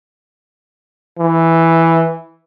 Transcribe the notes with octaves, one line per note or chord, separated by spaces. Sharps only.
E3